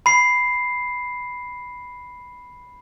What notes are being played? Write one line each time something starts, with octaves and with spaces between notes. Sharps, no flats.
B5 C7